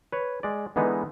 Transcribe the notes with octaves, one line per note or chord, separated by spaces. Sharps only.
B4 C#5
G#3 D5
D3 E3 G#3 B3 D#4